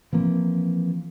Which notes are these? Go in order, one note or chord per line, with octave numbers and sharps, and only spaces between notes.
E3 F3 A#3 C4